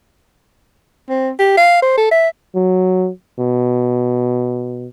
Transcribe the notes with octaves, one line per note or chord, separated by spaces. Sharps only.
C4
G4
F5
C5
A4
E5
F#3
B2